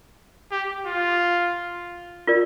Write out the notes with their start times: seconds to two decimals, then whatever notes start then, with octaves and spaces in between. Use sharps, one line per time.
0.52 G4
0.87 F4
2.27 F4 A#4 D5